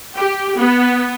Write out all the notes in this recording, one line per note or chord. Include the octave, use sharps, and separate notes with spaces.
G4
B3